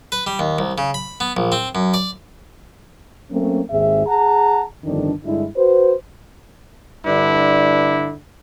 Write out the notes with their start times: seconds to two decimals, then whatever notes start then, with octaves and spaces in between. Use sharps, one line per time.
0.12 B4
0.27 G3
0.39 D#2
0.59 C2
0.78 C#3
0.94 B5
1.20 B3
1.37 A#1
1.52 C4
1.75 F#2
1.94 D5
3.31 F#3 A3 A#3 C4 C#4
3.71 G#1 D#2 G#2 C4 G#4 E5
4.07 G#4 F#5 A5 A#5
4.84 G1 F2 D#3 D4
5.24 G2 D3 G#3 D4 E4
5.56 F#4 B4 C5
7.05 G2 D3 D4 E4